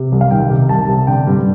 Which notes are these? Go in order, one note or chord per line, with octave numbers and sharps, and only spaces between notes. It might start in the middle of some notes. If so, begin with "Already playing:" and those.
Already playing: C3
C2
F5
D#3 G5
C3
C2 A5
C3
D3 G5
G2